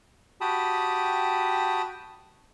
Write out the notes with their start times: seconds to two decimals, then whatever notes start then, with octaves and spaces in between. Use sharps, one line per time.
0.41 F#4 G4 G5 A5 B5 D#6